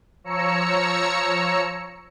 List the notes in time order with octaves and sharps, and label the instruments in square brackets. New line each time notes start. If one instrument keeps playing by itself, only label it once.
[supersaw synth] F3 C#5 A#5 E6 C#7